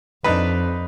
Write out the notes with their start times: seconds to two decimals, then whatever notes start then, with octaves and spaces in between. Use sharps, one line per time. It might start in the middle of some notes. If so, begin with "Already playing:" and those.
0.24 F2 D4 D#4 B4